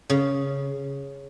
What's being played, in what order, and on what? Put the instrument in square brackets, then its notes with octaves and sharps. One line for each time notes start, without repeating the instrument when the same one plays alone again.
[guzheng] C#3